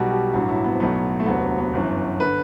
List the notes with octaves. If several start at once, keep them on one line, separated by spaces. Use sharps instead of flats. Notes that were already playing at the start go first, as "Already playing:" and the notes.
Already playing: B1 B2 G3 F#4
G4
A1 G2 F#3 F#4
E4
B3
C4
B1 A2 F#3 B3
A3
E1 D2 C3 F#3 B3
B3
G1 F#2 E3
D3 B4